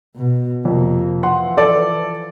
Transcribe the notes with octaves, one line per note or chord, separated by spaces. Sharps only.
B2
F2 C3 A#3
E3 F3 F#5 C6
A4 D5